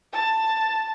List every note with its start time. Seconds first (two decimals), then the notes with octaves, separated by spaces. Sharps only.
0.13 A5